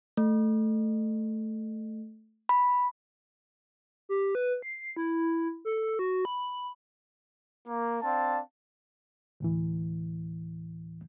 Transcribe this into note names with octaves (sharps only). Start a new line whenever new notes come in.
A3
B5
G4
B4
C7
E4
A4
F#4
B5
A#3
C4 D4 F5 A5
D2 A2 E3